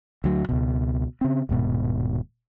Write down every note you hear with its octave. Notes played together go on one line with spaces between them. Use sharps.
D2 F#3
C#2 B2
C#3 C4
D#1 G#2 B2